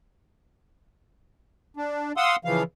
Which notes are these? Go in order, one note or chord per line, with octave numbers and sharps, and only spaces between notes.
D4
F5 F#5 C6 D#6 E6
C#3 E3 F3 F5